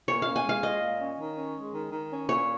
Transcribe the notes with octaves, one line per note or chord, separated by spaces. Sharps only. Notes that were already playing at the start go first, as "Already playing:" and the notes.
A#2 C#5
C#4 F5
G#5
G#3 F5
F4 D#5
A#2
C#4
D#3
C#4
G#3
D#3
D#3
C#4
A#2 C#5